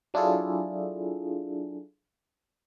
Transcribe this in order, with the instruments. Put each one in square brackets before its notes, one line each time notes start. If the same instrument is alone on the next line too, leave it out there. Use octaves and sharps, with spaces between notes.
[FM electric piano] F#3 D4 E4 F4 G#4 A4